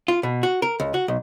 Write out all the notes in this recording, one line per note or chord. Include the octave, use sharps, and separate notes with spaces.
F4
B2
F#4
A#4
C#2
F#4
B1